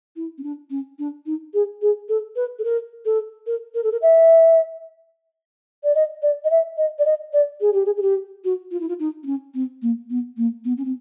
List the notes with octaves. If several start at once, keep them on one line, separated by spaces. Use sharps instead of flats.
E4
C#4
D4
C#4
D4
D#4
G#4
G#4
A4
B4
A4
A#4
A4
A#4
A#4
A4
A#4
E5
D5
D#5
D5
D#5
E5
D#5
D5
D#5
D5
G#4
G4
G#4
G#4
G4
F#4
F4
E4
F4
D#4
D4
C#4
C4
A#3
B3
A#3
B3
C#4
C4